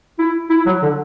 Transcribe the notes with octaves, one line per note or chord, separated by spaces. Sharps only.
E4
E4
F#3
D3